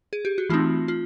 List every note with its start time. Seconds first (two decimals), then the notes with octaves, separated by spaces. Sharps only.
0.13 G#4
0.25 G4
0.38 F#4
0.50 E3 A3 C4 D#4 F4
0.88 F4